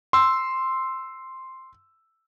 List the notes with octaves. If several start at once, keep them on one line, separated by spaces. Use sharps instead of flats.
C6 E6